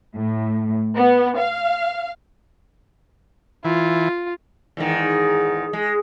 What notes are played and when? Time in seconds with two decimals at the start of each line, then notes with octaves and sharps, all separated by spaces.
0.16 A2
0.96 B3
1.39 F5
3.64 E3 F4
4.77 E2 G#2 D#3
5.73 G#3